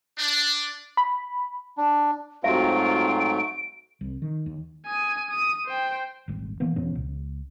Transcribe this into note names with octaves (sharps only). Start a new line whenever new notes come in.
D4
B5
D4
G#2 F#3 A3 C4 F4 F#4 E5 D7
C2
D#3
D#2
G#5 D#6
D#6
C5 G5
D#1 G#1
B2 E3 A#3 B3
E2 B2 C#4
C#2